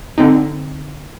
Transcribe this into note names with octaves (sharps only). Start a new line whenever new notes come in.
D3 C4 D#4